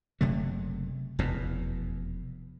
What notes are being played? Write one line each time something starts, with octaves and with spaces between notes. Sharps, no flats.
F#1 C3 F#3 A3
F1 E2 B2